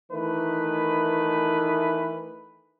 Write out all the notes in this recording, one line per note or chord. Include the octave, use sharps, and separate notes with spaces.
D#3 E3 A3 B4